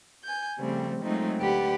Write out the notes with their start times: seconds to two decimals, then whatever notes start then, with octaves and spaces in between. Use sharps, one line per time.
0.24 G#5 G6
0.58 C#3 F3 G3 A3 C4
1.03 F#3 G#3 A3 C4 D#4 F4
1.41 D2 G4 B4 D5 F#5